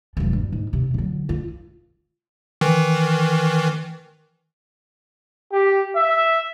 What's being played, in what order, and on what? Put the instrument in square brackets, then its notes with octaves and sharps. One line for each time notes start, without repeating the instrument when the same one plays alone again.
[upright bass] E1 F3
G2
G#2
C3
D3 F#3
F4
[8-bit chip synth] D#3 E3
[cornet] G4
E5